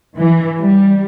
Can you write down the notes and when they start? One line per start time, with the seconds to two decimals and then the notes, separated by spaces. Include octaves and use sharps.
0.17 E3
0.59 G3